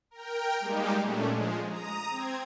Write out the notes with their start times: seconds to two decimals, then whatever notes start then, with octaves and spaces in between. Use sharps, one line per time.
0.11 A#4 G5
0.60 G3 G#3 A#3 D#4 G4
1.00 A#2 A3 C#4 D4
1.29 F3 G#3
1.66 A#5 D#6
2.10 C4 G#6